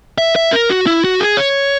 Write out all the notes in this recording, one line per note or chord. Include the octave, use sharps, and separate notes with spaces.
E5
E5
A#4
F#4
E4
F#4
G#4
C#5